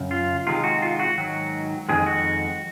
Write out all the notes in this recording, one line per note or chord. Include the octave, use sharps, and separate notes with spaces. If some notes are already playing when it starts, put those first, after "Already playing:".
Already playing: F#2 C#3
F4
C3 D#3 G#3 F4
F#4
F4
F#4
G#2 D#3 F#3
F2 C3 D#3 G#3 G#4
F#4